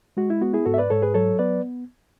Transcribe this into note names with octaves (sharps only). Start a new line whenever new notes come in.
G#3 F#4
E4
B3 F#4
E4 G#4
G#2 F#4 A4
E5
B4 D5
G#2 A4 C#5
G#4 B4
F#3 A4 C#5
B3 B4 D5